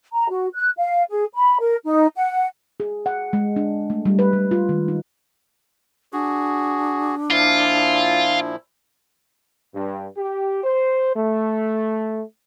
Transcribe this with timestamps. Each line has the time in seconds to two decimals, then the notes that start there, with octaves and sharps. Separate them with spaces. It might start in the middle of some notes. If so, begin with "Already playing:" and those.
0.13 A#5
0.29 F#4
0.54 F#6
0.77 F5
1.10 G#4
1.34 B5
1.60 A#4
1.84 D#4
2.16 F#5
2.80 G#4
3.06 F#5
3.33 G#3
3.56 D4
3.90 A3
4.06 G3
4.19 B4
4.33 G3
4.51 F4
4.69 D#3
4.88 D#4
6.13 D4 F#4 G#4
7.30 A#2 F3 E4 F4
9.74 G2
10.17 G4
10.64 C5
11.16 A3